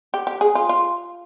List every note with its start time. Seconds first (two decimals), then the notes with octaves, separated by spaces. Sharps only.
0.14 G4
0.27 G4
0.41 G#4
0.55 F4
0.69 F4